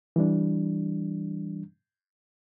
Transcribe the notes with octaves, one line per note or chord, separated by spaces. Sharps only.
E3 G3 D4